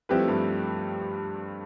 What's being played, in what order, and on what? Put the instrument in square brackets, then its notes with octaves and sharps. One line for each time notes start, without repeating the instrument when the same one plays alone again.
[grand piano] F3 C4 E4 G4 B4 [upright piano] G3
[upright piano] A3
G2 G3